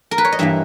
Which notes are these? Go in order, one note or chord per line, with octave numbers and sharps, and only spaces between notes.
A#4
B4
C#5
D#5
G2 E3 A#3 E5